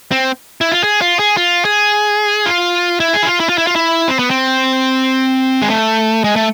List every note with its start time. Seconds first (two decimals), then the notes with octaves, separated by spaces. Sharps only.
0.11 C4
0.61 E4
0.72 F4
0.84 G#4
1.01 F4
1.19 G#4
1.37 F4
1.65 G#4
2.46 F4
3.00 E4
3.13 G#4
3.23 E4
3.27 F4
3.40 E4
3.49 F4
3.58 E4
3.67 F4
3.76 E4
4.08 C4
4.19 B3
4.30 C4
5.62 G#3
5.70 A3
6.24 G#3
6.36 A3